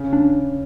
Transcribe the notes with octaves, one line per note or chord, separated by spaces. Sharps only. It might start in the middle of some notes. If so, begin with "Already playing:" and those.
Already playing: C#3
D4